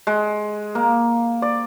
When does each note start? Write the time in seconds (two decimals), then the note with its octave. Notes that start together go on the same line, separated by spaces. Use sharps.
0.07 G#3
0.75 A#3
1.42 D5